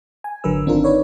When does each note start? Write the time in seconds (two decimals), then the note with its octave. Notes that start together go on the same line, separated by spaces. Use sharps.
0.24 G#5
0.44 G#1 D3 F#3 A#4 B4 E6
0.65 G#1 D#3 C4 D4 F4 A#4
0.84 D#4 B4 C#5 D5